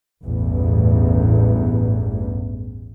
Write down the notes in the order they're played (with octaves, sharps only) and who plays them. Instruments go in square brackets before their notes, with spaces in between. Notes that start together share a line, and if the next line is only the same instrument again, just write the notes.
[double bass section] A1 E2 G2